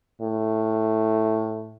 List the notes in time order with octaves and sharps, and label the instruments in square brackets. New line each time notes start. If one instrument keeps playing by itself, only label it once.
[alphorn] A2